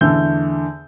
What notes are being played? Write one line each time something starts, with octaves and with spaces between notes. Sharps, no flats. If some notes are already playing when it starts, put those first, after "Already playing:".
E2 D3 A3 G6